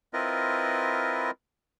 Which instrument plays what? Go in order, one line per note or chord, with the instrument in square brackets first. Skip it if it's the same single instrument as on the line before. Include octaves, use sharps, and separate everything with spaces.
[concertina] C4 E4 F4 A#4 B4 D#5